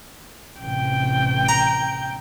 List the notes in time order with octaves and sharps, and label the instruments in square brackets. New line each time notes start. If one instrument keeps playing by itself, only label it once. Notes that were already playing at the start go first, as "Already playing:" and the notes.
[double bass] A1 C3 [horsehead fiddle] G5
[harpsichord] A#5